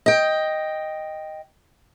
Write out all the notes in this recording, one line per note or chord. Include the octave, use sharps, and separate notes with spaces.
D#5 G5